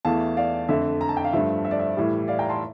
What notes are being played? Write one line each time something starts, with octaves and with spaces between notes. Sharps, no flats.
E2 E3 A3 F5 A5
D5 F5
F2 D3 A3 E5
A#5
A5
G5
F5
G2 F3 A3 E5
E5
D5
E5
A2 E3 G3
D5 F5
G5 A#5
A5 C6